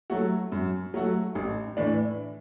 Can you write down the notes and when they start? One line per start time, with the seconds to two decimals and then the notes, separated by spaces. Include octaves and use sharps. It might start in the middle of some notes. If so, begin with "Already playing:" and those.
0.10 F#3 A3 F#4
0.52 F#2
0.94 F#3 A3 F#4
1.35 A1
1.77 A2 E3 D4